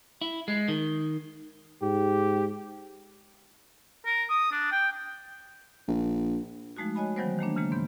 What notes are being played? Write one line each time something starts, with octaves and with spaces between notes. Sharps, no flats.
E4
G#3
D#3
G#2 G4
A#4
D#6
D4
G5
A#1
F3 G#3 A3 D#4 F#4
F#4 C#5 D#5 G#5 B5
D#3 E3 F#3 G3 B3 C5
D#3 A3 A#3 D4
C#3 E3 G#3 A#3
G#2 B3 G6